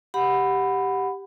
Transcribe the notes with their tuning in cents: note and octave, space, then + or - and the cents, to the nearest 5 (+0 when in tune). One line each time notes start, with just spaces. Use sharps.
G4 +0 F#5 -5 B5 +10